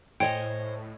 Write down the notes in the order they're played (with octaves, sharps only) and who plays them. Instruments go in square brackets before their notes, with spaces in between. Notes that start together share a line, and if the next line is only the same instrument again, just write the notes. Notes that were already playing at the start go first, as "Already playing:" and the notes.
[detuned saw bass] A2 [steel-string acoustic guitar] C5 [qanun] C#5 D#5 G#5 [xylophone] G5